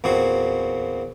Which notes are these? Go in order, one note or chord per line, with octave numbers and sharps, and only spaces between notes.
E2 A#2 C4 F#4